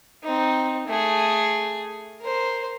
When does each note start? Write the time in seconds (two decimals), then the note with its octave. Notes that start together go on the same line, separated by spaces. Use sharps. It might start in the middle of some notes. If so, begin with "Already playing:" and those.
0.24 C4 D#4
0.87 A3 G#4
2.21 A#4 C5